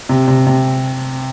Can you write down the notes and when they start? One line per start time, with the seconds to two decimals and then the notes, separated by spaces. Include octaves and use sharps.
0.09 C3
0.28 C3
0.47 C3